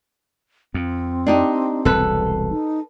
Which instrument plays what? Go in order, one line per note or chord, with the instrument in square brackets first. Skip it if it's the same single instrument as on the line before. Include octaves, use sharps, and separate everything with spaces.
[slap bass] F2 [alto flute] C4
[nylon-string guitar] D4 D#4 G4
[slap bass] E1 C2 [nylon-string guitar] A4 B4
[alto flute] D#4